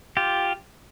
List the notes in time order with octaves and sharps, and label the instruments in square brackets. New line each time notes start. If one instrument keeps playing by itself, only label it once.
[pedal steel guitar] F4 G4